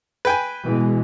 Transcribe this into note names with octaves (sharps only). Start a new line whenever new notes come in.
B4 G5 G#5
B2 E3 G#3